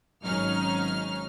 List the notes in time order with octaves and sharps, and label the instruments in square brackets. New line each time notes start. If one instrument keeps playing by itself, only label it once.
[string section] G#1 F#3 C#4 D#4 F6